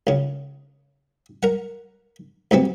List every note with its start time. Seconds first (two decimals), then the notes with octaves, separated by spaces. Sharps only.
0.07 C#2 C#3
1.43 A#4 F#5
2.51 D2 C3 B3 C4